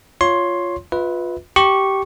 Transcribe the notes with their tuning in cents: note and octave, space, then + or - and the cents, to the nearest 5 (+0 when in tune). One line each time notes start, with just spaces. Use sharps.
F4 +0 C#5 +5 C6 +10
F4 +20 B4 +0 E5 -35
G4 -15 C#6 -10